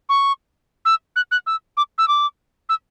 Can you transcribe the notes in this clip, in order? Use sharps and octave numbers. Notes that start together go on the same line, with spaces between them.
C#6
E6
F#6
F#6
E6
D6
E6
D6
E6